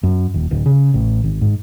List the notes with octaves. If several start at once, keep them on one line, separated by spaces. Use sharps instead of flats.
F#2
D#1
D1
C#3
A1
G#1
G#2